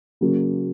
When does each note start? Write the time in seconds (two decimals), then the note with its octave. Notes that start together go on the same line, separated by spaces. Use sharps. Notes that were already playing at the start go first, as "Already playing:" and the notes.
0.21 C#3 F#3 A#3